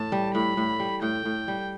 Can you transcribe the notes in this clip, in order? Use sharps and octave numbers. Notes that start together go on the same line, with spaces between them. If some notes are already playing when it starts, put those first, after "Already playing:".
Already playing: A2 E3 A5
G3
A2 B5
A2
G3
A2 G5
A2
G3